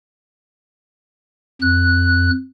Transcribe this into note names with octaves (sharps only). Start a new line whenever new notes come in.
F2 F#6